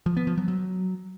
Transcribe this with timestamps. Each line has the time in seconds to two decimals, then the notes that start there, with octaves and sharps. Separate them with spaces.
0.06 F3
0.17 B3
0.27 F3
0.37 F#3
0.48 F#3